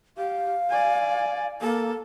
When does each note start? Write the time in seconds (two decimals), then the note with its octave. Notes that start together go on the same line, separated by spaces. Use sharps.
0.17 G4 F5
0.70 D5 G#5
1.61 A#3 A4